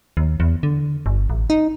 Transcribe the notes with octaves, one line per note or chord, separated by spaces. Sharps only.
D#2
E2
D3
G1
A1
D#4